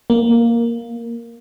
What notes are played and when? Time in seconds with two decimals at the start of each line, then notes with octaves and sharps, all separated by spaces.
0.10 A#3